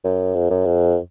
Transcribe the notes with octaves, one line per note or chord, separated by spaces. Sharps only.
F#2
F2
F#2
F2